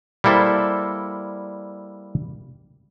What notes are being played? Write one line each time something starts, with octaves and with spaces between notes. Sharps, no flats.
G3 A#3 E4 A4 C5